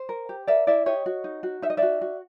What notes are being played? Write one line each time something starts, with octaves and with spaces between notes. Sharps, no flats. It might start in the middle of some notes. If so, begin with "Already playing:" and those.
Already playing: C5
A#4
G4
A#4 D5 E5
E4 D5 E5
G4 C#5 D#5
F#4
D#4
F#4
D#4 E5
D#5
F#4 D5 E5
F#4